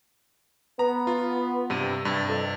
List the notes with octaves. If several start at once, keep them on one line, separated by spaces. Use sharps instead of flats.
B3 A#5
F4
G2 C3 D#7
G2 C3 A6
F2